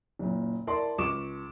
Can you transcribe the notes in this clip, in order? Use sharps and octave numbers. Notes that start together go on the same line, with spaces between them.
F#1 A#2
E4 A#4 D5 A5 C6
C#2 C#6 D6 E7